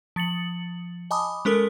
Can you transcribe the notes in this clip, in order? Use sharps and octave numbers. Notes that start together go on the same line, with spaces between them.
F3 A6 C#7 F#7
D#5 G#5 A5 B5 D6 D#6
G#3 C#4 A4 A#4 D#6